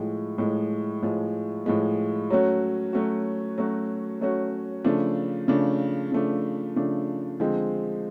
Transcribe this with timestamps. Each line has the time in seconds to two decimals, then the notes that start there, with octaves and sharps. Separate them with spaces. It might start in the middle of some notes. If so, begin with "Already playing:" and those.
Already playing: A2 F3 G#3
0.38 A2 F3 G#3
1.02 A2 F3 G#3
1.66 A2 F3 G#3
2.30 F#3 A3 C#4 F#4
2.93 F#3 A3 C#4 F#4
3.58 F#3 A3 C#4 F#4
4.21 F#3 A3 C#4 F#4
4.85 C#3 F3 A3 D4
5.48 C#3 F3 A3 D4
6.12 C#3 F3 A3 D4
6.76 C#3 F3 A3 D4
7.40 D3 F3 G#3 C4